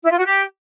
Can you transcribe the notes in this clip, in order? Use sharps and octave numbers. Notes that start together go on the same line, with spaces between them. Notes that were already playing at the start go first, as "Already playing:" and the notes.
E4
F4
F#4
G4